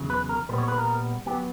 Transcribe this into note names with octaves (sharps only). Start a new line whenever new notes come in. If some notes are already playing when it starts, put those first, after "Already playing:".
Already playing: E2 C#3 F#3
B4
A#4
A#2 G3 B3 B4
C#5
B4
A#4
F#3 B3 G4